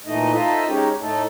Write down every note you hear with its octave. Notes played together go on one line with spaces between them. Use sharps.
A#2 E3 A3 D#4 D#5
D#4 F4 A4 C5 D#5 E5
G#3 C#4 D#4 G4
A2 A3 D#4 A4